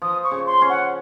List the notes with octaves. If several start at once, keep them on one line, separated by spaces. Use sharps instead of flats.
F3 D#6
C#6
C#3
C6
C#4
F#5